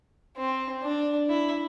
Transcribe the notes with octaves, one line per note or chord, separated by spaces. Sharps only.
C4
D4
E4